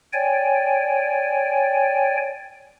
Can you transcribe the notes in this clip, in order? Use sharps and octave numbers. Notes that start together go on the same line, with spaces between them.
C#5 D5 G5 G#5